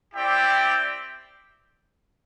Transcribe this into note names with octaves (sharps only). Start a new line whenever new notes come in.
C4 E4 G4 D5 G5